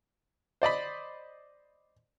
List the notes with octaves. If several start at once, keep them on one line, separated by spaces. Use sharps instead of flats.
C5 D5 D#5 B5